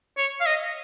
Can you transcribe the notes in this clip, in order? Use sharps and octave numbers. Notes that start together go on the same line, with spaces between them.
C#5
F5
D#5